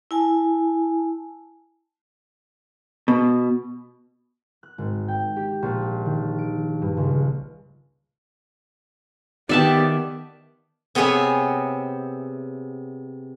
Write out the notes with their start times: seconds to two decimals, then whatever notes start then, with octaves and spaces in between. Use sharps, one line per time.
0.11 E4 G#5 A5
3.08 B2
4.63 F#6
4.78 G#1
5.08 G5
5.36 G4
5.62 A#1
6.06 D#3
6.38 D7
6.82 G2
6.97 C#2
9.49 D#3 B3 F#4 G4 D5 E5 A5
10.95 C3 B3 C4 G#4 C#5 E5